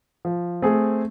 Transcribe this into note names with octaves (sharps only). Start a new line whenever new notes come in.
F3
A3 C4 G#4